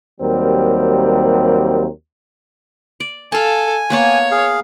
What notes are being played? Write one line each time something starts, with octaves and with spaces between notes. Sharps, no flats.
D#2 F#3 G3 C4 A#4
D5
A4 F5 G#5 A5
A#3 B3 C#5 A5
G#4 F5